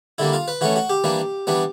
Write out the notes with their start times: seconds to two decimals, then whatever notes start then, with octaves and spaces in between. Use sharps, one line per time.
0.18 D3 G3 A#3 E4
0.33 F4
0.48 B4
0.61 E3 A3 C#4 F#4
0.76 F#4
0.90 G4
1.04 E3 G3 A#3 D4
1.47 E3 G3 B3 D4